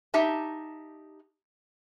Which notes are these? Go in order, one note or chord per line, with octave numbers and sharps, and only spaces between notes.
D#4 G4 E5 A5